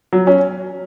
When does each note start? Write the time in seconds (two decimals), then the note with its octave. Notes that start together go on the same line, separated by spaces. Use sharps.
0.13 F#3
0.27 C#4